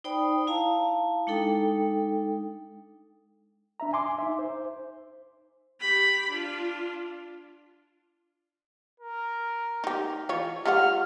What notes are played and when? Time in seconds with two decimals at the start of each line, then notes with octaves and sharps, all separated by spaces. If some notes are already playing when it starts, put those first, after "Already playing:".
0.04 D#4 C5 D5 G5 B5 D#6
0.47 E4 F5 A5 A#5
1.27 G#3 D4 D#4 A4 G5
3.80 D4 E5 A#5
3.93 G#5 C6 D6
4.18 D#4 E5
4.39 C5
5.80 G4 B5
6.29 D4 F4
9.00 A#4
9.84 D#4 G4
10.29 E3 F4 C#5
10.65 G3 F4 F#5 F6